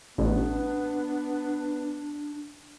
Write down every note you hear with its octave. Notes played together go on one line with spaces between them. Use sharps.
A1 B3 D4